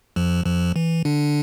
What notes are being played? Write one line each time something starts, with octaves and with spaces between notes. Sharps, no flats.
F2 F3
F2 F3
E3
D3 D4